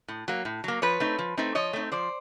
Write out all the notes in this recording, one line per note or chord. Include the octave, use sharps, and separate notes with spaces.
A2
F#3 A#3
A2
F#3 A#3
F3 B4 C#5
A3 C4 D#4
F3
A3 C4 D#4
F3 C#5 D#5
A3 C4 D#4
F3 C5 D5